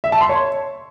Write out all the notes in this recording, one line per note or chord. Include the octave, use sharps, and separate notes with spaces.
E5
A5
C6
C#5